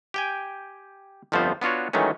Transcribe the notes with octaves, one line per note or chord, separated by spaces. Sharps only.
G4 G5 G#5
G1 F2 F3 A3 B3 C5
B3 D4 F4 F#4 C#5
D#3 E3 F#3 G#3 A3 C#4